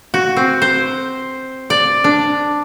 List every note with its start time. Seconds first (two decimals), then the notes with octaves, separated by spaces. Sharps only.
0.14 F#4
0.36 C4
0.62 C5
1.70 D5
2.04 D4